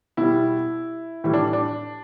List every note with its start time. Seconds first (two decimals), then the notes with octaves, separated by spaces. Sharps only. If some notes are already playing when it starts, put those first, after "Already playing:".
0.17 B2 G3 E4
1.24 A2 E3 G3 E4
1.33 D4
1.53 D4